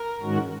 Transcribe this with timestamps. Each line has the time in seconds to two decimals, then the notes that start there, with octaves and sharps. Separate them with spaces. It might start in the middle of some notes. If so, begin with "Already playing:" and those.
Already playing: A#4
0.21 G#2 D#3 G#3 C#4 F#4